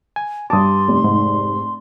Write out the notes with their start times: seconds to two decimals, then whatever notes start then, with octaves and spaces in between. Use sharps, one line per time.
0.16 G#5
0.50 G2 A5 C6 D6 D#6
0.88 F1
1.04 G#2